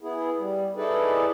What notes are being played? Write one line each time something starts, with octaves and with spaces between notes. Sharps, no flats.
B3 E4 G#4
G3
D#4 E4 G#4 A4 B4 D5